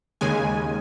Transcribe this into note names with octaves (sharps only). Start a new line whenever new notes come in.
D#2 C#3 G#3 G#5